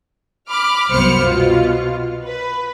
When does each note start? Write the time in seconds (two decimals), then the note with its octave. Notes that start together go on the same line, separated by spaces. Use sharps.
0.49 B5 D6 F6
0.90 C2 F#2 B3 C5 F6 C#7
1.25 B2 F4
2.25 B4